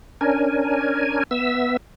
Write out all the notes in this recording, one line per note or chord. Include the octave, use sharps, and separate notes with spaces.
C#4 D4 A#4 G#5
B3 E5 E6